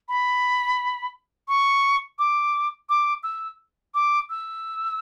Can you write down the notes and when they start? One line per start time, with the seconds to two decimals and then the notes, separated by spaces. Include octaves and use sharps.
0.09 B5
1.48 C#6
2.19 D6
2.89 D6
3.23 E6
3.94 D6
4.30 E6